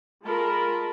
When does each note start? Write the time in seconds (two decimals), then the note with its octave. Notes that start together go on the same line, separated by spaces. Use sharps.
0.24 G#3 F4 A#4 A5 B5